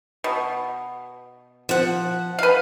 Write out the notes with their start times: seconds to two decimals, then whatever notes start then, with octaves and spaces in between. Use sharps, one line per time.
0.24 B2
1.69 F3 F#5
2.39 B4 F5